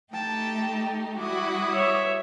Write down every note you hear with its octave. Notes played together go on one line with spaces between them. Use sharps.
A3 D#4 G4 G5 A5
G3 E4 F#4 D6 D#6
C#5 E5